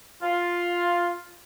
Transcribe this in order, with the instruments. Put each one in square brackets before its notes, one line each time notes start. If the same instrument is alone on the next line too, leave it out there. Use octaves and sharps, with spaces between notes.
[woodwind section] F4